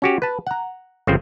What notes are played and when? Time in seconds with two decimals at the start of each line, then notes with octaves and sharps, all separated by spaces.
0.02 C#4 F#4 G4
0.22 B4 A5
0.47 F#5 A#5
1.07 G1 C#3 F3 C4 C5